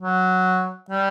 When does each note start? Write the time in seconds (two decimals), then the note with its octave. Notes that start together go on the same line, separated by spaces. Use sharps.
0.01 F#3
0.90 G3